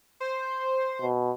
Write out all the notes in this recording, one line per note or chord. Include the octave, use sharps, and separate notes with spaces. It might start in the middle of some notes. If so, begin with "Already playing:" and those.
C5
B2